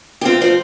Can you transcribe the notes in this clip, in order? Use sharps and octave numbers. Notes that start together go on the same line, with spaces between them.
G4
A3 C4 F4
F3 C4 F4